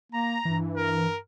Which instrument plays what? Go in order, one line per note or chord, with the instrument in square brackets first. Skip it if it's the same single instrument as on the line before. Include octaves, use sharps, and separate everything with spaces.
[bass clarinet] A#3 [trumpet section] A#5
[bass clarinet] G2 [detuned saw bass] E3
[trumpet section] A#4